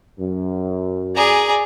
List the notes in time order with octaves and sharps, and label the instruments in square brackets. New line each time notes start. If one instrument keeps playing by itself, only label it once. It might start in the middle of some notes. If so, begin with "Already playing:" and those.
[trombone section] F#2
[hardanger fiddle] G#4 A#5 [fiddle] D5 G#5